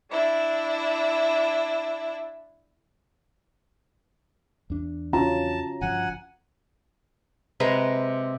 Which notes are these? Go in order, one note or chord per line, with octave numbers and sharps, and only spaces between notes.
D4 E4 E5
E2 D4
C#4 F4 F#4 A5 A#5
G1 F3 F#5 G#5
C3 G#3 B4 A#5